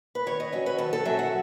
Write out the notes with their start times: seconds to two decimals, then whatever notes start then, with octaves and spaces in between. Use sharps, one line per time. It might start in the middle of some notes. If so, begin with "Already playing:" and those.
0.15 B4
0.26 D#3 C#5
0.40 D#5
0.52 F#3 C#4 C#5
0.66 B4
0.78 D#3 A4
0.93 A4
1.05 F#3 C#4 E5
1.19 F#5